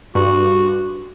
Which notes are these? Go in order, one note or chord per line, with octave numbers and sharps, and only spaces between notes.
G2 F#4